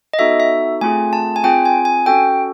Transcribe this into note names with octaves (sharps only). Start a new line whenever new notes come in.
D#5
B3 D#4 F#4 A4 E5
E5
A3 C4 F4 G#4 G#5
A5
G#5
C4 F4 G#4 G5
G#5
G#5
C#4 F#4 A4 G5